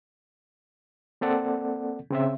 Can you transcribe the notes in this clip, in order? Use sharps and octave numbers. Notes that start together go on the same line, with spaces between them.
A#3 C4 A4 D5 F#5
C#3 C4 E5